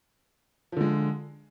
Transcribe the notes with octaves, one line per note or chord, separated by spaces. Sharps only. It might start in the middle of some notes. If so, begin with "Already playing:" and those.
D3 F3 G#3